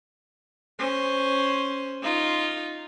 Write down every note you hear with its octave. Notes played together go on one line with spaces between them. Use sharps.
C#4 C5
D#4 F4